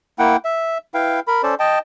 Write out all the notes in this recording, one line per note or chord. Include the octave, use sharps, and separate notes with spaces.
A#3 E4 F#5 G5
E5
E4 B4 F5 G5
A#4 B5
C#4 A4 C5 D5
D#5 G5 A5